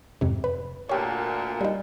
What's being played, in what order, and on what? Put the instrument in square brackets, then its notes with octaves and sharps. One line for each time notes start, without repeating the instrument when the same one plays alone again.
[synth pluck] F2 G#2 C3
B4
[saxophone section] D2 A#2 [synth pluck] G4 C#5
[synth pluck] G3 D#4